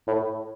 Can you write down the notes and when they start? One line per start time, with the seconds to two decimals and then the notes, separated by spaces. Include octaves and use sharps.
0.07 A2